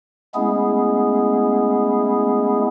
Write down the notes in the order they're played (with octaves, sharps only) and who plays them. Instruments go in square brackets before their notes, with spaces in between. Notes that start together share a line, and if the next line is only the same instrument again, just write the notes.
[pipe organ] G#3 A3 B3 C#4 E4 G#4